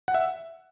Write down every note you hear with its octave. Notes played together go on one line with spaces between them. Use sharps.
F#5
E5